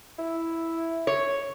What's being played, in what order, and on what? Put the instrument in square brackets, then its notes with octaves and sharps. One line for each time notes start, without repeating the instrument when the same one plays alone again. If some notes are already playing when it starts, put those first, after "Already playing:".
[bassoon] E4
[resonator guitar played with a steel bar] C#5